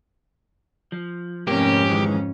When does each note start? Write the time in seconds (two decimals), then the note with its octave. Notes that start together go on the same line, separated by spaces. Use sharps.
0.92 F3
1.47 F2 G#2 C3 A3 A#3 C#4 G4
1.89 D#3 E3 G#3